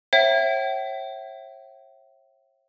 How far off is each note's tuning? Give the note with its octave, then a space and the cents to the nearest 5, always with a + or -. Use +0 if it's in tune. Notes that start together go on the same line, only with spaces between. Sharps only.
C#5 -40 E5 +15 G5 -40